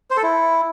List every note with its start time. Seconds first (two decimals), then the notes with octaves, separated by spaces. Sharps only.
0.11 C5
0.17 A4
0.23 E4